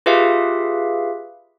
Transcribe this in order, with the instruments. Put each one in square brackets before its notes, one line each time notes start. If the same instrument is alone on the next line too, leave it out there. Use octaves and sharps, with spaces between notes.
[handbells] F4 G4 G#4 B4 E5 F5